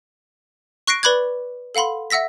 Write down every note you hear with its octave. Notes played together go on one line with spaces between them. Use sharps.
C#6 F#6 A#6 C7 D7
B4 D5 B5 D6 F#6 G#6
A4 F5 F#5 B5 C6
E5 F#5 E6 A#6 B6